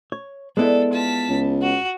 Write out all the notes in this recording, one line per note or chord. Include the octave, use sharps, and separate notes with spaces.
C#5
G#3 B3 E4 A4 B4 D5
F4 A5 B6
C#2
F#4